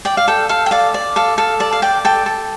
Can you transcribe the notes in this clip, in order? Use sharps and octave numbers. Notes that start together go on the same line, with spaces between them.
D5 G5
F5
A4 G5
A4 F5
G5
D5 F5
D5
A4 F5
A4 F5
D5 A5
F5
D5 G5
A4 G5
A4